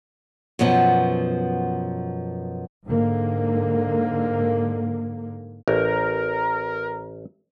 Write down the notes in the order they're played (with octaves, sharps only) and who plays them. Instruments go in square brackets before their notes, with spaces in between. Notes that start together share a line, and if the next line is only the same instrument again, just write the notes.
[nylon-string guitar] F#2 B2 F3 B3
[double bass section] G#2 D3 A#3
[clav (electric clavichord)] A1 [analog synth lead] A#4